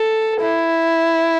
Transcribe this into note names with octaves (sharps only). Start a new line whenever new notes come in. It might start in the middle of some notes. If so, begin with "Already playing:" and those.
Already playing: A4
E4